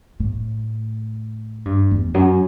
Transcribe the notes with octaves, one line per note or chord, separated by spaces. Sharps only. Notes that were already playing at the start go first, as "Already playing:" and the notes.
A2
G2
E2
F#2